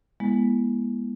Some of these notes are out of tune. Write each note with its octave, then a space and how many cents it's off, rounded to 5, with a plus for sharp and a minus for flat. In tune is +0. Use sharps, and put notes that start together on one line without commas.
G#3 +0 B3 -30 E4 +0